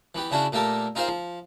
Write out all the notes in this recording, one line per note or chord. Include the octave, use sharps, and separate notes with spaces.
E3 B3 G4
C#3 C#4 D4 E4 F#4
A#2 A3 A#3 G4 A4 A#4
D#4 F4 G#4 A#4 C5 F5
F3